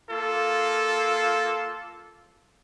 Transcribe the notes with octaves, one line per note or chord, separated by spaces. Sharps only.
A#3 F4 A4